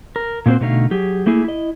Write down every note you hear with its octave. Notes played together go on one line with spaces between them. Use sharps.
A#4
A#2 A3 A#3 C4 F#4 C5
B2 D3 A3 D#4 A#4 F5
F#3 G4 G#4
A3 A#3 E4 G#4
E4 D#5